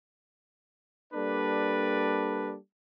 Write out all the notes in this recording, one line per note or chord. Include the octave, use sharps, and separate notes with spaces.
G3 A#3 D4 A4 B4 D5